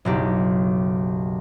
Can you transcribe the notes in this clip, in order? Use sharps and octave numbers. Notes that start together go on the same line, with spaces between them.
F#1 B1 G4